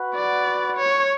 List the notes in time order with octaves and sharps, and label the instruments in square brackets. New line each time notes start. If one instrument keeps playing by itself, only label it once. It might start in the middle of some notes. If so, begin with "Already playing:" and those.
Already playing: [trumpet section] F#4 B4 F#5
[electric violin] D5
C#5